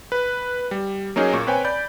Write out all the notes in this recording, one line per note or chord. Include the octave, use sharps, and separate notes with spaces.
B4
G3
F#3 A#3 C#4 D#4 G#4
A#2 A#3 C#6
C4 B4 C#5 G5 G#5
D5 B5 G6